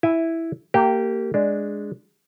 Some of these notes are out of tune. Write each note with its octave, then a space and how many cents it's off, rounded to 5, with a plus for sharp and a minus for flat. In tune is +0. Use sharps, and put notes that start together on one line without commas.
E4 +0 G#5 -15
A#3 -25 G4 -10
G#3 +0 D4 +0